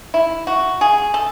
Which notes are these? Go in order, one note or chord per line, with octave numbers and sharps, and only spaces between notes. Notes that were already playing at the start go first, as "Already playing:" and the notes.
E4
F#4
G#4
A4